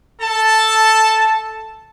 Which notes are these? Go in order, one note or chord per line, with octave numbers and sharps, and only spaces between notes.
A4 A5